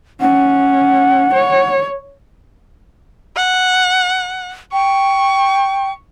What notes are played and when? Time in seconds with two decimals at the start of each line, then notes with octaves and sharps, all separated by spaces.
0.21 C#4 F#5
1.34 C#5
3.36 F#5
4.73 G5 C#6